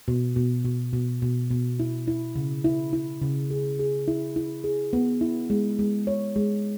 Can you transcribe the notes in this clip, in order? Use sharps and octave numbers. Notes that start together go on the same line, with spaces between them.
B2
B2
B2
B2
B2
B2
E4
E4
C#3
E4
E4
C#3
G#4
G#4
E4
E4
G#4
B3
E4
G#3
G#3
C#5
G#3